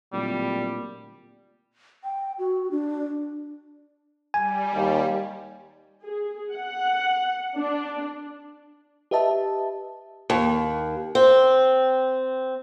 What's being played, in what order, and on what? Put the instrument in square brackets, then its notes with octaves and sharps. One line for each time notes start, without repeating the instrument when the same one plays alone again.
[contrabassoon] D1 [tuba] A#2 [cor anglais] G3
[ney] G5
F#4
D4
[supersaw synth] G3 [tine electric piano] G#5
[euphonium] D#2
[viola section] G#4
F#5
D4
[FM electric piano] G4 B4 D#5 E5 A5
[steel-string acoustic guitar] D#2
C4